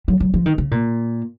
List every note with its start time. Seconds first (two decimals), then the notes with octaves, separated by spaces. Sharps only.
0.08 F#3
0.20 F#3
0.34 F3
0.46 D#3
0.58 C#3
0.71 A#2